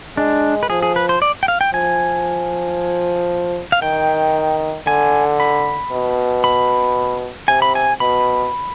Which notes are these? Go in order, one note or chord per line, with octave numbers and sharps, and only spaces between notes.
G#3 D4
B4
F3 G#4
G#4
B4
C5
D5
G5
F5
G5
F3 G#5
F5
D#3 G5
D3 G#5
B5
B2
B5
C3 G#5
B5
G#5
B2 B5